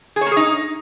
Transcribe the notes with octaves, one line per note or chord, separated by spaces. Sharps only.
G#4
C#5
A#3
G#4
D#4